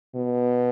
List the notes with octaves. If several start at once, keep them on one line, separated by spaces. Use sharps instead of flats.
B2